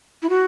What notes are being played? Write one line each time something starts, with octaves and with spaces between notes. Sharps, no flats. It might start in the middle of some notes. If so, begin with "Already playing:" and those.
E4
F#4